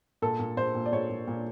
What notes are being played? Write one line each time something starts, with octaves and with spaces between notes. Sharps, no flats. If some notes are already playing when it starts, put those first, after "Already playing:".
A#2 A4
A#2
A#2 C5
A#2
D5
A#2 C#5
A#2
A#2